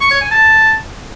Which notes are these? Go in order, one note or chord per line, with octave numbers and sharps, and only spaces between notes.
C#6
C#5
G#5
A5